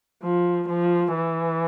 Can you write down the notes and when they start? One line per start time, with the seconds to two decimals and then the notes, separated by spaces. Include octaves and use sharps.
0.23 F3
0.68 F3
1.15 E3